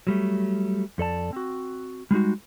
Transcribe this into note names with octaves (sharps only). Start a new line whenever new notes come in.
F#3 G3 A3
F2 A4 D5 A5
C4 F#4
G3 G#3 D#4 F#4